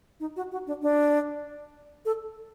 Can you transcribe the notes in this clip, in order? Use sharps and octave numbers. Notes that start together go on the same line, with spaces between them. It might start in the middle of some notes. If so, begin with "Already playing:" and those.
D#4
F#4
F#4
D4
D4
A4